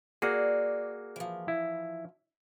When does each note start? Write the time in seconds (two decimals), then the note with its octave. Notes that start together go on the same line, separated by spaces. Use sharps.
0.22 A#3 F#4 G#4 D5
1.16 E3 F3
1.48 E4